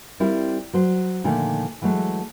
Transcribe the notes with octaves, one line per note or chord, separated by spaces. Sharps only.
G3 C4 E4 F4 A#4
F#3 C5
A#2 D3 D#3 F3 A3
E3 F#3 G#3 A3